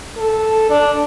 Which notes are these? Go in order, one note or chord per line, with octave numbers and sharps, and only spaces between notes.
A4
D4